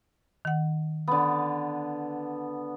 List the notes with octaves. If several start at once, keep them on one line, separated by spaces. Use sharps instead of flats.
D#3 F#5
D3 B3